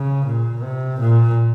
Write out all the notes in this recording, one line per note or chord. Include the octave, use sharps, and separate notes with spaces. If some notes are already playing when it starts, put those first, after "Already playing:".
Already playing: C#3
A#2
C3
A#2